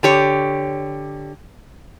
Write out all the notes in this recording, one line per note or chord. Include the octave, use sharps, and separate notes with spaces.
D3 G4 C#5